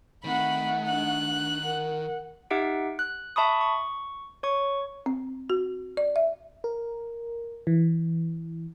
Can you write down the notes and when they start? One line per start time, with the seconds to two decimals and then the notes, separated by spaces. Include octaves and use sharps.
0.24 D#3 A3 C4 F#5 B5
0.88 D4 F#6
1.64 A#4 F#5
2.50 D#4 G4 E5 F#5 D7
2.99 F#6
3.36 E5 A5 B5 C#6 D#6
3.61 C#6
4.43 C#5 C#6
5.06 C4
5.50 F#4
5.97 D5
6.16 E5
6.64 A#4
7.67 E3